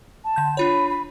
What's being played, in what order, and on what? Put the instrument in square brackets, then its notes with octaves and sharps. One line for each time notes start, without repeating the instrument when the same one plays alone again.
[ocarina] A5
[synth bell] D3 G6
[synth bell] D4 F4 C#5 [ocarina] B5
[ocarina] B5